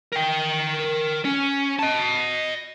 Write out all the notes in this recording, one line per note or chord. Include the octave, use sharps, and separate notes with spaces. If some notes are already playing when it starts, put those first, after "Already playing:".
A#4 G5
C#4
D#5 A5